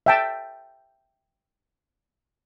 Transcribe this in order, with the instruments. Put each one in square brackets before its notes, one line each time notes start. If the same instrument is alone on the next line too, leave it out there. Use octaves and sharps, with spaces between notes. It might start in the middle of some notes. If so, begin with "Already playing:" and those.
[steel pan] E5 G5 A5